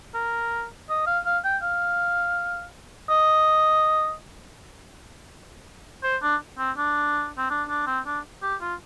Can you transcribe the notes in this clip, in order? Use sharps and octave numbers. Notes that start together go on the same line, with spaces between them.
A#4
D#5
F5
F5
G5
F5
D#5
C5
D4
C4
D4
C4
D4
D4
C4
D4
G4
F4